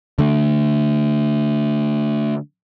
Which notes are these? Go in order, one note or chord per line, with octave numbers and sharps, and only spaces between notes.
D3 A3